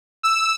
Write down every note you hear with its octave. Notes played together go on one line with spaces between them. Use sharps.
E6